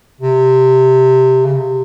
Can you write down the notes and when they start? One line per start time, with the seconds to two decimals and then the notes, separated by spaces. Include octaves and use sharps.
0.21 C3
1.45 C#3
1.54 C3